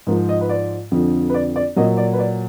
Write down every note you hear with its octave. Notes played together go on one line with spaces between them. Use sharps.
G#2 F3 A#4
D#5
B4
D5
F2 D3 F3
B4
D5
D5
A#2 F#3 D#5
D5
B4
D5